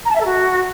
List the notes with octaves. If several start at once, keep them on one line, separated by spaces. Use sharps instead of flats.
A#5
A5
E5
A4
F#4